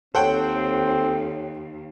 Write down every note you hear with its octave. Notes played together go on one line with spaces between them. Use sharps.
D#2 C4 A4 C5 C#5 F#5 G5